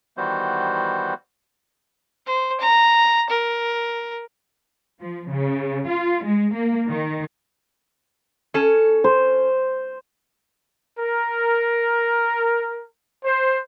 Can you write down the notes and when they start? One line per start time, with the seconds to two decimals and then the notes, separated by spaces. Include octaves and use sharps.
0.17 D#3 E3 G3 B3 F#4 C5
2.26 C5
2.60 A#5
3.30 A#4
5.00 F3
5.29 C#3
5.87 F4
6.24 G#3
6.54 A#3
6.89 D#3
8.54 C#4 A4
9.04 C5
10.99 A#4
13.25 C5